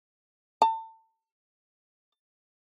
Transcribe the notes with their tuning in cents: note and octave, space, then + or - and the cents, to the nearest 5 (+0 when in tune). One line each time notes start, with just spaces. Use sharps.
A5 +30